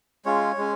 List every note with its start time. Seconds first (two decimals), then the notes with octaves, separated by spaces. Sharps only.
0.25 G#3 C#4 F4 C#5
0.58 G#3 C#4